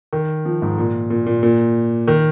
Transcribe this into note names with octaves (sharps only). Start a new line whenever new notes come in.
D#3
F3
G#2
A#2
A#2
A#2
A#2
D#3